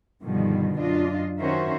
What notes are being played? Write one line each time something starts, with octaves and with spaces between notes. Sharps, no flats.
G2 B2 D3 D#3 F3 G3
F#2 D4 F4 D#5
D#3 C#4 F#4 A#4 C5 E5